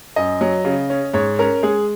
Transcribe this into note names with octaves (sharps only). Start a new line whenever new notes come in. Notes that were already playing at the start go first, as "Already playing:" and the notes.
F#2 D#5
F#3
C#3
C#4
G#2 C#5
C#4 A#4
G#3 G#4